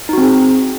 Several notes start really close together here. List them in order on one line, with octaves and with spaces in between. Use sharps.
D#4 F#4 C4 G#4